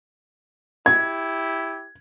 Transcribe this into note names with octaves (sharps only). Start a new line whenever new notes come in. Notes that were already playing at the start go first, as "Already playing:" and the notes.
E4 G4 G#6